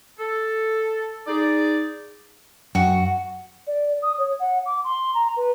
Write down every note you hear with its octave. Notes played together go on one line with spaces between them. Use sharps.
A4
D#4 G#4 D5
F#2 F#4
D5
D#6
C#5
F#5
D6
C6
A#5
B4